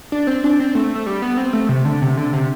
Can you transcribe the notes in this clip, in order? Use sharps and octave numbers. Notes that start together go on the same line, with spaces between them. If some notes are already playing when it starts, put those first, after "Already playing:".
D4
C4
D4
C4
A3
A3
G3
B3
C4
A3
C3
D3
C3
D3
C3